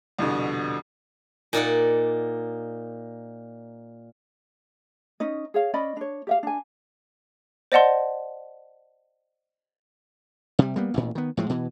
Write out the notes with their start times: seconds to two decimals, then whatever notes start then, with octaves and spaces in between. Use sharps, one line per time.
0.18 C2 F2 B2 D3
1.53 A#2 D#4 D5 F#5
5.20 C#4 D#4 D#5
5.54 G#4 C#5 F5
5.74 C#4 D5 D#5 B5
5.97 D4 C#5
6.27 G4 E5 F5
6.43 D4 G#5
7.72 C5 D5 D#5 F#5 A5 C6
10.59 C3 G3
10.76 G3 A#3 B3
10.94 A1 D2 A#2
11.15 D#3 B3
11.37 A2 F3 G#3
11.50 B2 E3